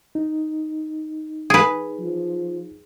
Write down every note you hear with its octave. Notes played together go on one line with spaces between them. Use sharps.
D#4
G#4 B4
F3